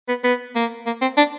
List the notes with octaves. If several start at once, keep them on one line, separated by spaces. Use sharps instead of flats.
B3
B3
A#3
A#3
C4
D4